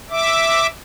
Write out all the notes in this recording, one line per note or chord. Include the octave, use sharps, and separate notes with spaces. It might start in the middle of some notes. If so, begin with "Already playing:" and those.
E5 D6